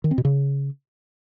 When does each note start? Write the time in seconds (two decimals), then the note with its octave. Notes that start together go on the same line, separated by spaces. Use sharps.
0.04 D#3
0.11 C4
0.18 B2
0.25 C#3